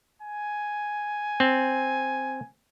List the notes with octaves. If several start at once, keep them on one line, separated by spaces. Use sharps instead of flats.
G#5
C4